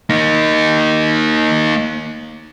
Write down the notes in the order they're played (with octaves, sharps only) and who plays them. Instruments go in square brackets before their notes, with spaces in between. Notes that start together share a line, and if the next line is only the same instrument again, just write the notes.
[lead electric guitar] A#3 D#4